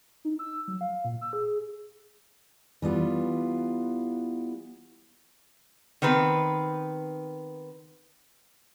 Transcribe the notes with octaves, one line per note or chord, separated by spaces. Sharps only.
D#4
E6
F#3
F5
A#2
E6
G#4
E3 G3 B3 F4
D#3 B3 C4 B4